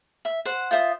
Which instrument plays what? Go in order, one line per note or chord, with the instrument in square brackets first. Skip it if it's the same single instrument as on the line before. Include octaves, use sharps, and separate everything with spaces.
[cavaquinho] E5
C5 F#5
F4 C5 E5 D#6